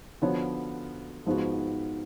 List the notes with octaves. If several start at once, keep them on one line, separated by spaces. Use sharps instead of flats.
D3 F3 B3 F#4 C#5
G#2 F3 G#3 B3 F#4